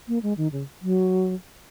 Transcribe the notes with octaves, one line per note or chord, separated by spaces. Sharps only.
A#3
G#3
D#3
C#3
F#3